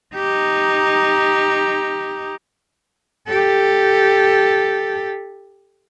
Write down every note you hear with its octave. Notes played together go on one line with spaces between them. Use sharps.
D#4 G4
G4 A4